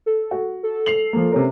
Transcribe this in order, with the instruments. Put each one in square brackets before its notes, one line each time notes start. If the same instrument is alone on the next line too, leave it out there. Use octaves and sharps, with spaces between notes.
[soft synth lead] A4
[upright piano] F#4
[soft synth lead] A4
[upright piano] C7 F7 F#7
F3 A#3
C3 C#4 A#4